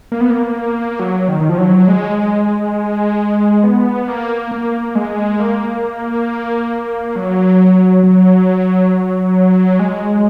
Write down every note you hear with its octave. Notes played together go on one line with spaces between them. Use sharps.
A#3
B3
A#3
F#3
D#3
D#3
F3
F#3
G#3
B3
A#3
A#3
G#3
A#3
F#3
F#3
G#3